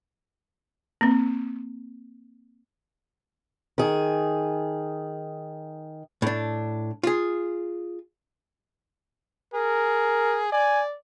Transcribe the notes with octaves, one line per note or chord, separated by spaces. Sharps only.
A#3 C4
D#3 G#4
A2 D4
F4 G#4
G#4 A#4
D5 G#5